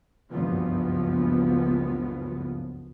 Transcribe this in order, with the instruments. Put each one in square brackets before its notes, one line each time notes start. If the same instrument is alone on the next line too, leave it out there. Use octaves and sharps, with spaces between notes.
[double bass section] F#1 C#2 G2 E3 F3 B3